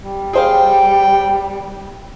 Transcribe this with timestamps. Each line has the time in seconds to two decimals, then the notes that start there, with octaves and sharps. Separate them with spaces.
0.03 G3
0.33 G#4 C5 F5 G5